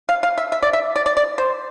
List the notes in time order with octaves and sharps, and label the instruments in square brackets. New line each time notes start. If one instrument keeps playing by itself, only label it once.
[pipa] F5
F5
E5
E5
D5
E5
D5
D5
D5
C5